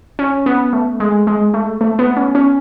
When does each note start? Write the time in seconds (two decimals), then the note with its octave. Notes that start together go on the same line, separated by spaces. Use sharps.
0.19 C#4
0.46 B3
0.73 A3
1.00 G#3
1.27 G#3
1.54 A3
1.81 A3
1.99 B3
2.16 C#4
2.35 C#4